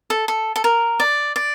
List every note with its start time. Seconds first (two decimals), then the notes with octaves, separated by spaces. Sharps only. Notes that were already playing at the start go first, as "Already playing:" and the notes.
0.10 A4
0.28 A4
0.56 A4
0.64 A#4
1.00 D5
1.36 D5